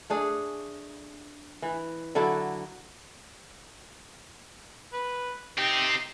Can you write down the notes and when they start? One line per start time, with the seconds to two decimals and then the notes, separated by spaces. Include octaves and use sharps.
0.10 A3 D4 G#4
1.62 E3
2.15 D3 F#3 E4 A4
4.93 B4
5.58 C4 D#4 G4